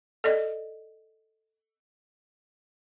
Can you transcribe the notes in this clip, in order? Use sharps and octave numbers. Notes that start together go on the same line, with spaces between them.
A4 D5 D#5